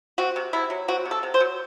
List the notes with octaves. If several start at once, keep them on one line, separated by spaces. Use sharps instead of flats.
C4 F#4
C3
C3 E4
F#3
C4 F#4
C3
A4
C3
C5
F#3